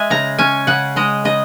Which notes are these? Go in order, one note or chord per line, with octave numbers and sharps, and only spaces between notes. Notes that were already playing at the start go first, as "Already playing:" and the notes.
Already playing: G#3 E5 G#5
C#3 A#5
C#4 G#5
C#3 F#5
G#3 D#5
C#3 D#5